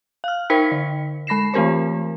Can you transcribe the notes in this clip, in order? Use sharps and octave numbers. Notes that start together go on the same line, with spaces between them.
F5 F6
D#4 A#4 C5 G5 B6 C#7
D3
G#3 B5 A#6 C7 E7
E3 A3 C4 G4 A#4 C5